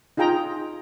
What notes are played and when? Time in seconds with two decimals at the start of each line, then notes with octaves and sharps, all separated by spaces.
0.17 D#4 F4 G#4 G5 A#5